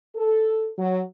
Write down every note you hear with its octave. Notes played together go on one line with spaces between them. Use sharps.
A4
F#3